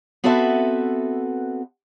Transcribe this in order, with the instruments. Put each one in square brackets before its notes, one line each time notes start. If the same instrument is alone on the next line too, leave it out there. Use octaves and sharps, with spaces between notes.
[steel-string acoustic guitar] B3 C4 F#4 A4 B4 E5